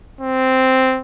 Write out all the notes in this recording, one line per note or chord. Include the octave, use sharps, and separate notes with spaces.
C4